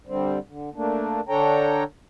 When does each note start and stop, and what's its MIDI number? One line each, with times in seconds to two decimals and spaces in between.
0.07 0.39 50
0.07 0.39 55
0.07 0.39 60
0.48 0.70 50
0.75 1.21 57
0.75 1.21 58
0.75 1.21 62
1.29 1.84 50
1.29 1.84 62
1.29 1.84 69
1.29 1.84 73
1.29 1.84 79
1.29 1.84 82